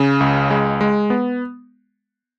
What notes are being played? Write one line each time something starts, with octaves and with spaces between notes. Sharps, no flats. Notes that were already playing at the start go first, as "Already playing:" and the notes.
Already playing: C#3
C#2
G#3
G#3
B3